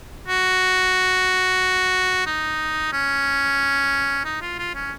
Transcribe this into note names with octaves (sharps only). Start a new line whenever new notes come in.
F#4
D#4
C#4
D#4
F4
F4
C#4